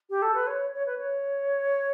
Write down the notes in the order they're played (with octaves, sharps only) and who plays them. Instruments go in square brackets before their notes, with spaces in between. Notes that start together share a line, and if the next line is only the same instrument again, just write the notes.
[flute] G4
A4
B4
C#5
C#5
B4
C#5